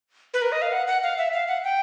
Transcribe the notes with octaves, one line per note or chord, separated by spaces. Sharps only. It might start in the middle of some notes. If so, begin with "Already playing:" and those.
B4
A#4
D#5
F5
F#5
F#5
F5
E5
F5
F#5
G5